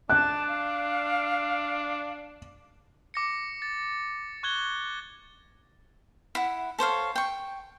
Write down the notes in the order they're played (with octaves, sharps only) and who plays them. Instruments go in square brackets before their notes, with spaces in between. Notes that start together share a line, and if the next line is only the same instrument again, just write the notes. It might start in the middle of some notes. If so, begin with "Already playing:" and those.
[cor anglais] D4 [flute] A5 [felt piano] F#6
[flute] F5
[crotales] D6 A#6 C#7
A6
C#6 F#6 G#6 G7
[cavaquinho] E4 F#5
A4 C5 C#5 F5
G5 C#6